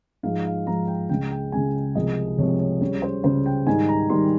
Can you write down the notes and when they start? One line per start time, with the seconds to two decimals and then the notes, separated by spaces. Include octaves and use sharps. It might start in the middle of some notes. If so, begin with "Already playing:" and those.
0.23 G#2 F3 G#3 F5
0.45 F5
0.67 G#2 F3 G#3 A#5
0.88 G5
1.09 C#2 C#3 G#3 G5
1.31 G5
1.52 C#2 C#3 G#3 G#5
1.95 C2 C3 F3 G#3 D#5
2.38 C2 C3 F3 G#3 C#5
2.60 C#5
2.81 C#2 C#3 G3 C#5
3.02 C5
3.24 C#2 C#3 G3 C5
3.46 G5
3.67 G#2 D#3 G3 G#5
3.88 A#5
4.10 G#2 D#3 G3 C6